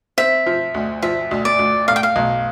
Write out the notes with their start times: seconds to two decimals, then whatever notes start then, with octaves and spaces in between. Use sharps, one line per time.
0.18 C4 E5
0.46 F3
0.74 D2
1.02 F3 E5
1.31 D2
1.45 D5
1.59 D2
1.88 A2 F5
1.96 G5
2.03 F5
2.16 B1